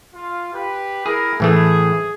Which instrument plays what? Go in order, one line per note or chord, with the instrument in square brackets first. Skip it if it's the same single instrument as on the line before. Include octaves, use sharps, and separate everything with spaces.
[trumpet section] F4
G4 B4
[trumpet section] E4 A#4 [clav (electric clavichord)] G#4
[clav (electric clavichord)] A2 E3 A3 [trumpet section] G#4